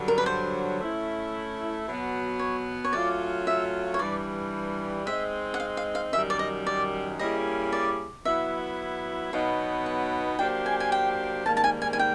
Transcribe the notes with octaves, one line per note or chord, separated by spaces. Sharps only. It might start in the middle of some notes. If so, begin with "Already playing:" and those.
Already playing: G2 D3 F#3
A#4
B4
C5
A3 C#4 E4
B2 F#3 B3
C#5
C#5
F#3 A3 C#4 F4 D5
E5
C#5
G2 E3 G3 D5
G#3 C4 D#4 E5
F#5
F5
F5
F5
F#2 D#3 G3 E5
D5
D#5
D5
G3 A#3 C#4 E4 G#4 D#5
D5
F#3 B3 E4 E5
B2 F#3 B3 D#4 F5
F#5
F#3 A#3 D4 G4 C5 G5
G#5
G#5
G5
G#2 D#3 G3 A#3 A5
A5
G#5
G#5
G#5
G5